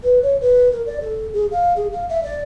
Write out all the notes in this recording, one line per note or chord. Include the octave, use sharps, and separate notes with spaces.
B4
C#5
B4
A#4
D5
A4
G#4
F5
G#4
F5
E5
D5